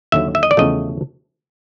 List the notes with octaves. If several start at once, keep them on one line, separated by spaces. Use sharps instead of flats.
D#2 D3 F#3 E5
E5
D#5
D5
E2 C#3 F3 A3 D#5